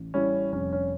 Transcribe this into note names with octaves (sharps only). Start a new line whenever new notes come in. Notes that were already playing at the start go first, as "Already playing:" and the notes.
Already playing: A1
G3 C#4 E4
F1 C#4
C#4